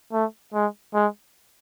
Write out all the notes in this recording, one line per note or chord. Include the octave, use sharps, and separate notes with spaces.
A3
G#3
G#3